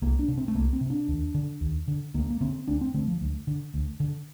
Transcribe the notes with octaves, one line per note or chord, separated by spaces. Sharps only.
C2 A#3
D4
C3
C4
A3
C2 A#3
C4
C3
D4
D#2
D3
D#2
D3
D2 A#3
A#3
D3 C4
D2 D4
C4
D3 A3
F3
D2
D3
D2
D3